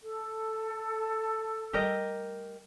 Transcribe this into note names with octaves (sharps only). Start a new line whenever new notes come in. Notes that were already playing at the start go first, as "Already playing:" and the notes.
A4
G3 A3 G4 A#4 D#5